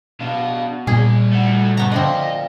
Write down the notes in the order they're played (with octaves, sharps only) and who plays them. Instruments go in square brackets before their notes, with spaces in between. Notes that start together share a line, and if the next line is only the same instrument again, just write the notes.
[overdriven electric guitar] B2 [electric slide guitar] D4 F5
[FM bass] A#2 [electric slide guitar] G3 D5 G#5 [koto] G#4
[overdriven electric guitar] A3 F#4
[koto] A3 B3 A#5
[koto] D3 F3 C4 [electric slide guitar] D5 F5 [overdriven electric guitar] D#5